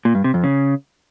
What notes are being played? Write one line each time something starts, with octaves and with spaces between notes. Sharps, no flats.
A#2
G2
C3
F2
C#3